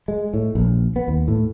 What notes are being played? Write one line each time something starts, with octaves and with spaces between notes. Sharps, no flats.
G#3
A2
A#1
B3
D#2
A2